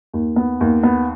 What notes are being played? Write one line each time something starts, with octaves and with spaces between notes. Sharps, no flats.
D#2
B3
D#2
B3